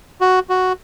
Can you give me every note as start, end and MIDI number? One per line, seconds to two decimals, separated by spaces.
0.21 0.39 66
0.50 0.73 66